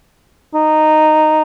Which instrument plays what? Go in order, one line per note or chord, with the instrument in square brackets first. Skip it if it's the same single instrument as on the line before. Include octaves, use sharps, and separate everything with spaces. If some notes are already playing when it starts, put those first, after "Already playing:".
[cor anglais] D#4